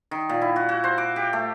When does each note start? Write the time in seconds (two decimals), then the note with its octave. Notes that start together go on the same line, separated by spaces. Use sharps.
0.11 D#3
0.29 A#2
0.41 E4
0.56 F#4
0.69 F#4
0.84 C5
0.98 D6
1.16 G4
1.33 A3